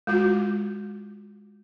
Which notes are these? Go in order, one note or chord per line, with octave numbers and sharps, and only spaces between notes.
G#3 F4 F#4